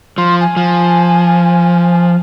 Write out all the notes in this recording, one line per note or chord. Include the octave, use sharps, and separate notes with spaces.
F3 C6
G#5
F3